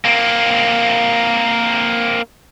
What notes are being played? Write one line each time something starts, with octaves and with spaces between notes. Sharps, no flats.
A#3 C4